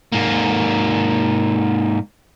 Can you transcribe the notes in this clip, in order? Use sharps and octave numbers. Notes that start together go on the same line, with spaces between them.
G#2 A#3